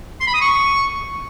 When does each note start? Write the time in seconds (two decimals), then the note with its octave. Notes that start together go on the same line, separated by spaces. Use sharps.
0.20 C6
0.27 B5
0.34 D#6
0.41 C#6